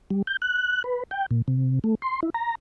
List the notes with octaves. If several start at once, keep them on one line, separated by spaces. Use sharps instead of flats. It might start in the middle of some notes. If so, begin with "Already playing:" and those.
G3
G6
F#6
B4
G5
A#2
C3
A3
C6
E4
A#5